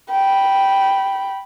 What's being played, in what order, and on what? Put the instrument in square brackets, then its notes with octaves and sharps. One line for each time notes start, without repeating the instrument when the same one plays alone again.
[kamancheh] G5 B5